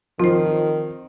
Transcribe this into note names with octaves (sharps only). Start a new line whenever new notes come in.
D#3 F3 C4 C5